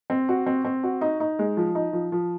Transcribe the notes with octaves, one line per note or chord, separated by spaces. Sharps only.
C4
F#4
C4
C4
F#4
D#4
D#4
G#3
F3
D#4
F3
F3